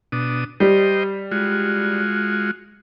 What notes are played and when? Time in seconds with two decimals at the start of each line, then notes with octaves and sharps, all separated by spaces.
0.12 B2 D4 D#6
0.60 G3 C5 D#5 G5
1.31 G#3 F4 F#4